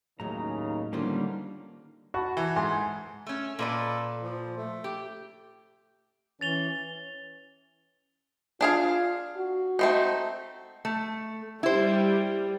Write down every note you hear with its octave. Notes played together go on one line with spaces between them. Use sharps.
D#2 A2 C#3 F#3 D#4 A#5
D3 D#3 G3 A#3 C#4 F4 C5
F#4 F#5 A5 B5
E3
G#2 G#5 C6
A3 C#4
A#2 A4 B4 D5
F3
A3
G4
E3 C#4 A6 F7 G7
D4 F4 G#4 F5
F#4
A3 C4 D#4
A3
G3 E4 C5